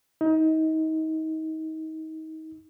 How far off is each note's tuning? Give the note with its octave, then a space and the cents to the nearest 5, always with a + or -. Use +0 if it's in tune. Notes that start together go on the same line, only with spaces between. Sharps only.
D#4 +30